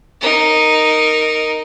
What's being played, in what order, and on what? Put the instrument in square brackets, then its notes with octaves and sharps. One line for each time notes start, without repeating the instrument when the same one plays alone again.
[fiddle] D#4 A#4